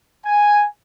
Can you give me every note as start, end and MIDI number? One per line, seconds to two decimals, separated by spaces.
0.24 0.65 80